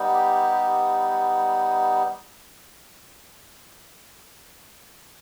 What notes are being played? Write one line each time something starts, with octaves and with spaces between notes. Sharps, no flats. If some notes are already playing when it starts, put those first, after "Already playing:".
Already playing: G3 B3 D#4
G4